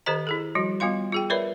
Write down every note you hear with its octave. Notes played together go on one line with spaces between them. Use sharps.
D#3 G4 A4 C5 D#5 A#5
E4 G#4 A4
F3 G3 F#4
G3 B3 F4 F5 C6
F4 G#4 G5
A#4 B4 C#5 D5 E5 B5